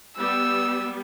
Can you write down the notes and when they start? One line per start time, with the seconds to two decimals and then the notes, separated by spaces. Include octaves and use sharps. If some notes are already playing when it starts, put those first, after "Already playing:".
0.17 G3 B3 E6